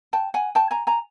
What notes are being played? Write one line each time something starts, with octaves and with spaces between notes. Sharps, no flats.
G5 A5
F#5 G#5
G5 A5
G#5 A#5
G#5 A#5